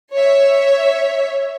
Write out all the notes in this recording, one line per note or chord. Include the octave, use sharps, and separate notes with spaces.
C#5 E5